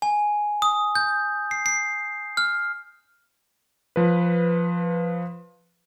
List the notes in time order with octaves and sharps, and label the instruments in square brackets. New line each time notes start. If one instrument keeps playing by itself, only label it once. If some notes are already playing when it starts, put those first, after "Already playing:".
[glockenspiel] G#5
D#6
G6
C7
C7
F6
[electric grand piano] F3 B4